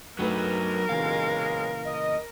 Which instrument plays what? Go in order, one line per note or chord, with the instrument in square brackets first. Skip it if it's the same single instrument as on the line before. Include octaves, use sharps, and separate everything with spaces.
[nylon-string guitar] G2 A3 B4 [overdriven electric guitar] F#3 D#4 [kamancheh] A#4
[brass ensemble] B1 G#3 [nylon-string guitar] A#2 C#3 E3 [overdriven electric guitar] F5
[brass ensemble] D#5